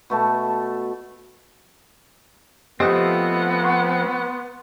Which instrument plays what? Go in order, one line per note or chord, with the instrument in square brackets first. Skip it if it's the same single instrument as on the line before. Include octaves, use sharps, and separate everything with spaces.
[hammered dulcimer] B2 A3 A5
[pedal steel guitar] F3 A3 C4 [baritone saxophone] B3 [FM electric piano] G4 D#5
[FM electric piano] F#5 C6 C#6